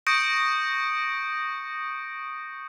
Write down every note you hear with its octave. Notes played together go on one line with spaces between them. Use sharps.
C#6 D#6 G6 A#6 C#7 D7